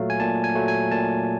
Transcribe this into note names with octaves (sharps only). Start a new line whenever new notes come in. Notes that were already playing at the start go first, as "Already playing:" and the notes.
Already playing: A#2 F#3 A3 F5
G#5
A#2 A5
G#5
F#3 A3
G#5
A#2 A5